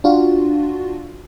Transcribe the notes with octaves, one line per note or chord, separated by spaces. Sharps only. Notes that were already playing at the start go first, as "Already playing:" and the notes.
D4 F4 F#4